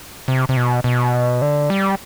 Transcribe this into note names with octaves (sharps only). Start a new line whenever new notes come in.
C3
C3
B2
B2
D3
G3